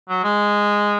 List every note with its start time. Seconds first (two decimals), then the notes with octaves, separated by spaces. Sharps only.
0.09 F#3
0.24 G#3